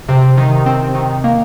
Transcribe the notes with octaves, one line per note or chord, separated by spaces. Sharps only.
C3
D#3
C4
D#3
A#3